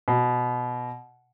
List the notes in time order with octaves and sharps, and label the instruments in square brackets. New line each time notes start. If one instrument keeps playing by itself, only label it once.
[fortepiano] B2